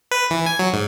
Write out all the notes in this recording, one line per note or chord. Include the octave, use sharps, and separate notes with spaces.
B4
E3
G#5
F#3
G#2